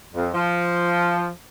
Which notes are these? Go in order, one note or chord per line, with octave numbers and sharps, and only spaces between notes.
F2
F3